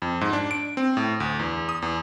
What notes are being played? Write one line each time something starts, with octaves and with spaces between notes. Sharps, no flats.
F2
G#2
D4
D7
C4
A2
D2
E2
D#6
E2